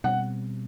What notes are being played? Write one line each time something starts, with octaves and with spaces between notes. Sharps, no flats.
B2 G3 C4 F#5